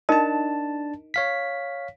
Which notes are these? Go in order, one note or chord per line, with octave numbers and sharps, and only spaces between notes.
D4 D#4 A#4 D#5 A5
C#5 F5 B6